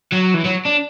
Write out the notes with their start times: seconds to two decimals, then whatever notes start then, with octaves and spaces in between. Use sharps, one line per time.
0.12 F#3
0.34 E3
0.45 F#3
0.65 D4